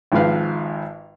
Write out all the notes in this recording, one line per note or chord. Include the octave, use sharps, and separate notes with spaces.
G#1 G#2 F3 G#3 B4 F5